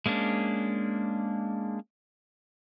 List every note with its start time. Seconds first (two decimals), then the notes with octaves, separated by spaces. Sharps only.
0.06 G#3 A#3 C#4 D4